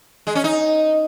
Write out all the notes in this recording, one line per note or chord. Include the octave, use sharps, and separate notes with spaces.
G#3
C#4
D#4